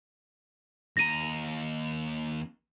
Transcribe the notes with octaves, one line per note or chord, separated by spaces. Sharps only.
D#2 A#5 A#6 D#7